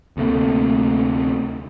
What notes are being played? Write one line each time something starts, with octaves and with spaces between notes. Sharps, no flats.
D2 C3 A3 A#3